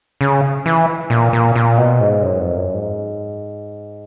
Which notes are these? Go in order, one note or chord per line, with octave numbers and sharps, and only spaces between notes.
C#3
E3
A#2
A#2
A#2
B2
G#2
F#2
F2
F#2
G#2